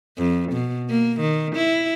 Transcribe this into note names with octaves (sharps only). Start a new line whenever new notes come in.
F2
B2
A#3
D#3
E4